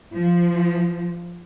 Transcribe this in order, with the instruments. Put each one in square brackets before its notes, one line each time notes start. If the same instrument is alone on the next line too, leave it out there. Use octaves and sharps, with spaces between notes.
[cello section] F3